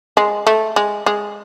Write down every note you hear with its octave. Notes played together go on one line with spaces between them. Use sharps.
G#3
A3
G#3
G#3